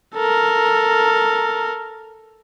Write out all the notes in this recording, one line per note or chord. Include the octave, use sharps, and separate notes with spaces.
A4 A#4